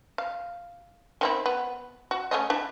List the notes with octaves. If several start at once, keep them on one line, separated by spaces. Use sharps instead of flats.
F5
D#3 C4 E4
B3
F#4
A3 C#4 D#5
D4 E4